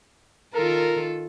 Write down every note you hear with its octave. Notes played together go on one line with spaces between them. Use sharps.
D#3 F4 A4 A#4